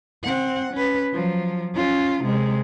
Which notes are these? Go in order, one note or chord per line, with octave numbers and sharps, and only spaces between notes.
C4 F#5
C#4 B4
F3 F#3
C#4 F4
C3 G#3